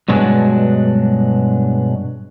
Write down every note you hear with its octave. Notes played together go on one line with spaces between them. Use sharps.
G2 B2 F#3 G#3 D4